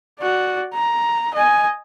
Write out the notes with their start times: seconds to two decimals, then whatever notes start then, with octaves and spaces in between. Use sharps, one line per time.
0.20 F#4 D5
0.74 A#5
1.34 D#5 G#5